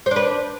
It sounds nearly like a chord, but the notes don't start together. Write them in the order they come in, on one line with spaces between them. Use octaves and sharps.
C5 D4 B4